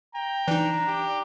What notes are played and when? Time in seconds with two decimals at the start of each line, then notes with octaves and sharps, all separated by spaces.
0.15 G5 A#5
0.48 E3 D4 D#4
0.87 G4